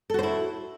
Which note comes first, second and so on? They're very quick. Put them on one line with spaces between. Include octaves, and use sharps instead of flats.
A4 F#4 C5 E4